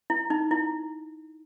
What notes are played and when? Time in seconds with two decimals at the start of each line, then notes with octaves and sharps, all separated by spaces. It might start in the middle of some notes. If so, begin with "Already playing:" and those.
0.10 E4
0.30 D#4
0.51 E4